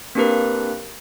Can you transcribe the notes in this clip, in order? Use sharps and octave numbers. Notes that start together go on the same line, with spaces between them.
A#3 C4 D4 G4 A#4 B4